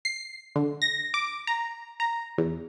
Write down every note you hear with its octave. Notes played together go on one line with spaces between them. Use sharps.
C7
D3
A#6
D6
A#5
A#5
E2